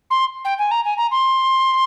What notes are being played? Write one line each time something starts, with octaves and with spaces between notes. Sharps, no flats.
C6
G5
G#5
A#5
G#5
A#5
C6